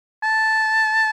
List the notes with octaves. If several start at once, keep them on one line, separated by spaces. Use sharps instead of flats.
A5